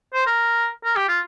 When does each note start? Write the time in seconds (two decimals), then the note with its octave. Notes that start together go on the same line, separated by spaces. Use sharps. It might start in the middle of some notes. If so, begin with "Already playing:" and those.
0.14 C5
0.26 A#4
0.84 A#4
0.96 G4
1.08 F4